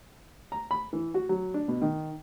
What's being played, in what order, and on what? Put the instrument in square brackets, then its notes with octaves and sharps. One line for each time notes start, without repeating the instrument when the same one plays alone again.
[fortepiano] A#5
B5
E3
F#4
F#3
D4
B2
D#3